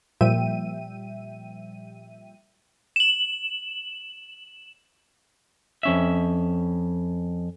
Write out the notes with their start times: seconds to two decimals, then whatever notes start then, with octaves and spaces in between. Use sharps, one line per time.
0.21 A#2 F3 G3 E5 G5 D#7
2.96 E7 F#7
5.83 F2 C#4 E5